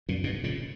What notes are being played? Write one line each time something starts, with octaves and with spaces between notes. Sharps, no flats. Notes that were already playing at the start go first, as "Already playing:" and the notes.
F#2 A#2
G2 B2
A#2 C#3